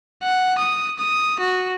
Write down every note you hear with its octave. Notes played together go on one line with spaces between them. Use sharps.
F#5
D#6
D#6
F#4